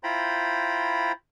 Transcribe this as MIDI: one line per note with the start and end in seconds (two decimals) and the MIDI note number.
0.04 1.12 64
0.04 1.12 65
0.04 1.12 72
0.04 1.12 79
0.04 1.12 82
0.04 1.12 83